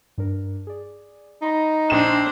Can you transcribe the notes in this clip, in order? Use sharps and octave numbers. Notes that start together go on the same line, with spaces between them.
G2 D4 A#4
G#4 D5
D#4 B5 C6 A#6
A#1 D4 C5 E7